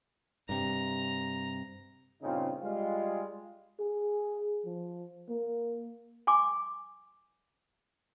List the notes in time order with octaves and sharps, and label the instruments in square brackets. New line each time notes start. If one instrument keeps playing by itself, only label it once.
[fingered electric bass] G2 C3 [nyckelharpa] A#5
[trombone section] G2 A#2 C#3 C4 D#4 F4
G3 G#3 F4
[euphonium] G#4
F3
A#3
[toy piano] G#5 C6 D6